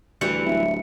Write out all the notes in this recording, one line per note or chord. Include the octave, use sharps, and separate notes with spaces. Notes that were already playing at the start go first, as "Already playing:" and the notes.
D2 E3 G3 C#7
D1 E5